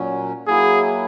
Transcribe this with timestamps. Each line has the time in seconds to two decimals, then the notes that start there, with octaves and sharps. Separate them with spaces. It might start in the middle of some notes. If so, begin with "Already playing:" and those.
Already playing: A#2 F#3 C#4
0.47 F#3 A#3 E4 G#4